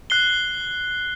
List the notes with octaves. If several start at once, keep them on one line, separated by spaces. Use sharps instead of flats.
F#6 C7 G7